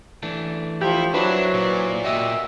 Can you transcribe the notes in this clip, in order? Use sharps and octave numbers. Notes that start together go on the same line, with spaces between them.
E3 A3 D4
F3 E4 G4
F#3 D4 E4 B4 C5 E5
A#2 D5
F#4 G4 D#5 E5